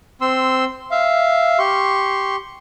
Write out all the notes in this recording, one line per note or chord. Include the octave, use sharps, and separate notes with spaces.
C4 C6 E6
E5 F5
G4 C6 C#6